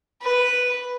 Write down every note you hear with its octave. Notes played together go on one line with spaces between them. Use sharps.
B4